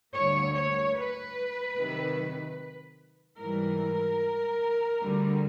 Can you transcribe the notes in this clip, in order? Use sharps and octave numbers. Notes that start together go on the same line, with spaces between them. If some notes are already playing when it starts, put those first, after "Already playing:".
D2 D3 G3 A#3 C#5
C#5
B4
C3 D#3 F#3
G#2 E3 G3 A#4
D2 D3 G3